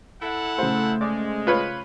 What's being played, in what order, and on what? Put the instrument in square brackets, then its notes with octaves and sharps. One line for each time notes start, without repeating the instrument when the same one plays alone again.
[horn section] E4 A4 F#5
[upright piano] C#3 C5 [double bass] A3
[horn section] G#3 [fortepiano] D5
[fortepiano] F4 B4 C#5